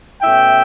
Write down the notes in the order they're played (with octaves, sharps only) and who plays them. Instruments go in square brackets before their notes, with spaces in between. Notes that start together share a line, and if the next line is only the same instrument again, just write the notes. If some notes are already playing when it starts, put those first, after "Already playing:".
[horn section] B2 A3 C#4 E5 G5